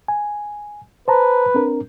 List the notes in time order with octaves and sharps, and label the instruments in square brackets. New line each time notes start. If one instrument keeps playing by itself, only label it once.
[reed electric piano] G#5
[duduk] B4 [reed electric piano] C5 A5 A#5
[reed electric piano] C4 D4 A#4